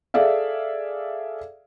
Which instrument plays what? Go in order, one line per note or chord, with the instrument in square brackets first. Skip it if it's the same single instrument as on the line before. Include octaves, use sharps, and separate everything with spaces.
[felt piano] G#4 A4 D5 E5 F5